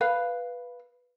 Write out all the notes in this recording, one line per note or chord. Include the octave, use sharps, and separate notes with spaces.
B4 F5